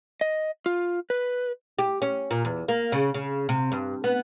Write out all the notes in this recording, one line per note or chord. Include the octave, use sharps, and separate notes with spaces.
D#5
F4
B4
G4
C#4
A#2
E2
A#3
C#3
C#3
C3
G2
B3